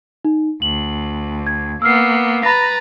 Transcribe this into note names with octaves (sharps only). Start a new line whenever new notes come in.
D#4
D2 F#7
G#6
A#3 B3 E6 F6 C7
B4 A#5 B5 A6 A#6